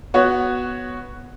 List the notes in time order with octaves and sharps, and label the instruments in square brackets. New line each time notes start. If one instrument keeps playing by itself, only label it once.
[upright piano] B3 F#4 C#5